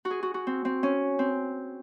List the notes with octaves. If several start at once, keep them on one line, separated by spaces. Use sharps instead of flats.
F#4
G#4
F#4
F#4
C4
C4
C#4
C4